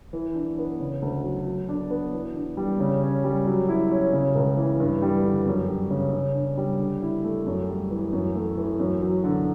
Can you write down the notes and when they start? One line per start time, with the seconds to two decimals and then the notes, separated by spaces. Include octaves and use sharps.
0.13 E3
0.35 D4
0.58 B3
0.80 C#3
1.02 D2
1.24 F#3
1.46 F#3
1.69 D4
1.90 B3
2.13 E3
2.36 D4
2.57 G3
2.80 C#3
3.02 C#4
3.24 G3
3.46 F#3
3.69 E4
3.91 C#4
4.13 C#3
4.35 C#2
4.57 E3
4.80 G2
5.02 G3
5.25 D3
5.47 F#2
5.69 G3
5.91 C#3
6.13 C#3
6.35 D4
6.57 G3
6.80 D3
7.02 E4
7.24 A3
7.46 F#2
7.69 G3
7.91 E3
8.13 F#2
8.35 A3
8.57 E3
8.80 F#2
9.02 F#3
9.24 D3